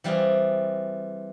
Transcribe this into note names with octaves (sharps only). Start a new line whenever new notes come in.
E3 G3 C4 F4 G#4